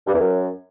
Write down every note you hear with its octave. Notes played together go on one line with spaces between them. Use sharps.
G2
E2
F#2